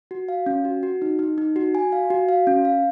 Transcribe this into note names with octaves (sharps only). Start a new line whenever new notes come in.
F#4
F5
C#4
F#4
F#4
D#4
D#4
D#4
F#4
G#5
F5
F#4
F5
C#4
F5